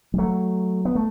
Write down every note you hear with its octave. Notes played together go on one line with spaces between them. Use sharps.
G3
F#3 A3
B3
A3